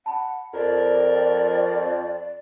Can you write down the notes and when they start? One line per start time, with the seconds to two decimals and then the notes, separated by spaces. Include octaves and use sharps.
0.06 F#5 A5 B5
0.54 F2 A#4 D5